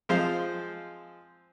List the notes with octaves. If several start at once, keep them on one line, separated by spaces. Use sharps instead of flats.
F3 G#3 C4 C5 F5